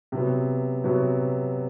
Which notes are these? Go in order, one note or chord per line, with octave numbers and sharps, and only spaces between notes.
C3 F#3 B3
C3 F#3 B3